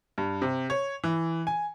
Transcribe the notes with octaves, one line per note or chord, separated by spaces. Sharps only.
G2
C3
C#5
E3
G#5